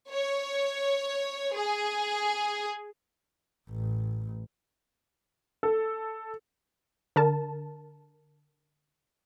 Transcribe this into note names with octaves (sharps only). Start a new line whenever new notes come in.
C#5
G#4
A1
A4
D3 A#4 A5